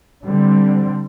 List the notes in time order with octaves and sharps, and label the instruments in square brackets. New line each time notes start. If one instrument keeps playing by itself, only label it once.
[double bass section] D3 G3 C4